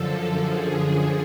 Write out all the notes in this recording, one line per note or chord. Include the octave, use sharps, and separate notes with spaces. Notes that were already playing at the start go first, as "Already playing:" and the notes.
Already playing: F#2 D3 F3 A4
G#4